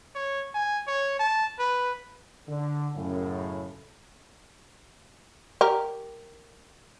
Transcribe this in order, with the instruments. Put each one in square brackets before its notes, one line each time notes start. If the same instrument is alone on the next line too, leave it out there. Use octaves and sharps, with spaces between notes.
[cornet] C#5
G#5
C#5
A5
B4
[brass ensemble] D3
F#2 A2 C#3
[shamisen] G4 A#4